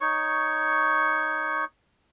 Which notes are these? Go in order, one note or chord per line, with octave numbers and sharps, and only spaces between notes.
D#4 C#5 C#6